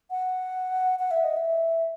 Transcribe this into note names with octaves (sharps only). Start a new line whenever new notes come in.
F#5
F#5
E5
D#5
E5